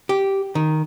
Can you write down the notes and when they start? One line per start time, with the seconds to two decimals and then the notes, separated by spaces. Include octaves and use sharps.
0.09 G4
0.55 D#3